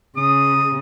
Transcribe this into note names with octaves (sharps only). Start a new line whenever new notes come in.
C#3 D#6